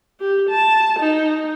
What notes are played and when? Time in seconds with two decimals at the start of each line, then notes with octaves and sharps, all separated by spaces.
0.20 G4
0.50 A5
1.00 D#4